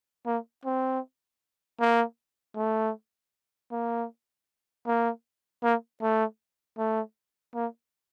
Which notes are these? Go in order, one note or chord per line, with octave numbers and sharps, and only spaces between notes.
A#3
C4
A#3
A3
A#3
A#3
A#3
A3
A3
A#3